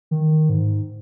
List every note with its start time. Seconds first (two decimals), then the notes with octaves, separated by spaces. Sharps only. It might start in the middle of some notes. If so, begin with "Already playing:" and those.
0.11 D#3
0.49 G#2